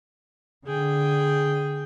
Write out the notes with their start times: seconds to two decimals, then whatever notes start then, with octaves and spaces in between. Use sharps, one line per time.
0.67 D3 G#4 G5